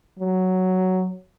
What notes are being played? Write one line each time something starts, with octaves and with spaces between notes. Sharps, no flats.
F#3